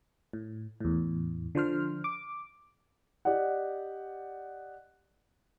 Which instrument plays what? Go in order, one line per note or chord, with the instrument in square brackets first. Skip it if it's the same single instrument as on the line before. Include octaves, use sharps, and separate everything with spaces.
[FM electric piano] A2
E2 A2
D3 F3 C5 F6
D6
[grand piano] G4 D5 D#5 F#5